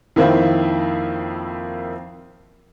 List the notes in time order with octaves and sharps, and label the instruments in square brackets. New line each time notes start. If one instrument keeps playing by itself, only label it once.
[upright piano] F2 D#3 A#3 C4 E4 F4